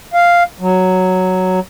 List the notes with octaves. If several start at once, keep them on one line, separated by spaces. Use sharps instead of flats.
F5
F#3